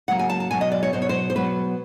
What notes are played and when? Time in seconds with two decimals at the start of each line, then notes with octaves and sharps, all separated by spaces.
0.08 C#3 F#3 A#3 F#5
0.19 G#5
0.30 A5
0.40 A5
0.51 B2 F#3 B3 G#5
0.61 D#5
0.72 D5
0.83 C#5
0.93 B2 F#3 B3 C5
1.02 C#5
1.09 C5
1.30 C5
1.35 B2 F#3 B3 B4